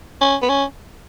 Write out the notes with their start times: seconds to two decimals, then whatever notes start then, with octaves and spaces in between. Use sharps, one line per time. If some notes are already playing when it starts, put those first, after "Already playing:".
0.21 C#4
0.42 B3
0.49 C#4